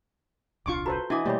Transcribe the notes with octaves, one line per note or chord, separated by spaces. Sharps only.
D#1 C2 D4 F4 C#6 D6
F#4 A4 B4 C5 A#5 B5
E3 D4 F#4 D#5 F#5 G#5 D6
B2 G3 A3 A#3 G4 C5 C#5 B5